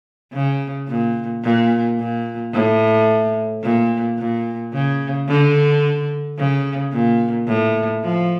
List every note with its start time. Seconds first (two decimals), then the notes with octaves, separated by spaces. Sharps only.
0.33 C#3
0.88 A#2
1.43 A#2
1.99 A#2
2.53 A2
3.63 A#2
4.19 A#2
4.73 C#3
5.28 D3
6.38 C#3
6.93 A#2
7.48 A2
8.03 F3